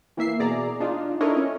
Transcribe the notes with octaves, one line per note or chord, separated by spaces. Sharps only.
E3 A#3 E5 C7
B2 G#4 D5 A#5
D4 D#4 F4
D4 E4 A4 A#4 C#5 D#5
C#4